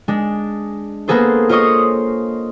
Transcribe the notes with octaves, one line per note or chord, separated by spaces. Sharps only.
G#3 D4
A#3 B3 G#4 A4 C5
F4 C5 C#5 D#5 C#6 D#6